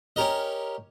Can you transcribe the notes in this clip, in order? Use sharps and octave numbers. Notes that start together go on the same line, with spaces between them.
C#4 G4 A#4 D#5